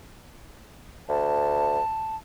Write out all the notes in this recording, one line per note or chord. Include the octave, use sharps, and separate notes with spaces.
D2 A5